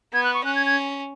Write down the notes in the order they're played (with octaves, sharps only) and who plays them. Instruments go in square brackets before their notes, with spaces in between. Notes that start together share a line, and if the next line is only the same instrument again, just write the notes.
[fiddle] B3 [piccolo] G#6
[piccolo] F#6
C#6
[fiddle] C#4 [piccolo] F#6
[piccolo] G#6
G#6